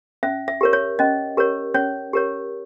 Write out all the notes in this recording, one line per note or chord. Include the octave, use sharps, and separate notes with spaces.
C#4 E5
E5
G4 A#4 C#5
C#5
C#4 D#5
G4 A#4 C#5
C#4 C#5
G4 A#4 C#5